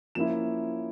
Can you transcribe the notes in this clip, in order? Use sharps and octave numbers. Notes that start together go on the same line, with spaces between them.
F3 A#3 C#4 E4 E7